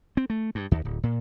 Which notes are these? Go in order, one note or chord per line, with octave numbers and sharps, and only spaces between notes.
C4
A3
G2
D#2
D1
A#2